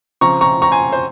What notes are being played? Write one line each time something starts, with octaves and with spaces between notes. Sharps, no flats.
C#3 F3 C4 A#5 C#6
A#5 C#6
A#5 C#6
G#5 C6
C5